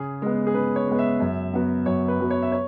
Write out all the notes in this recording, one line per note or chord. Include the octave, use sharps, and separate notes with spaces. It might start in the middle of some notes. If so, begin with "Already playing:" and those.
Already playing: C#3 G#4
G#3 B3
G#4
C#3 B4
C#5
G#3 B3
E5
F#2
F#3 B3
F#2 C#5
B4
F#3 B3
C#5
E5
C#5